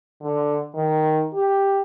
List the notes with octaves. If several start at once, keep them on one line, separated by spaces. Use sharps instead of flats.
D3
D#3
G4